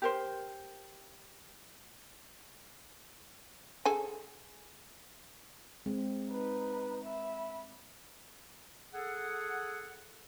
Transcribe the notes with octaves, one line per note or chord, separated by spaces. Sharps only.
G4 A#4 C5
G#4 A4 G#5
G#3 C4
D#4 B4
E5 B5
G#4 A4 F#5